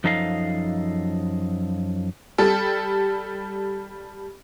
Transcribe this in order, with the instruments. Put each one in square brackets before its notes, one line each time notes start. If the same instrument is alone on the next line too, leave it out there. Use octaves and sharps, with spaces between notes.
[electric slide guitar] F#2 F3 D#4 A4 D#5 F5
[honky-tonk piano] G3 A4